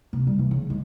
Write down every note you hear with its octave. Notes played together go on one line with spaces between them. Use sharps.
C3
G3
E3
C#3
G#3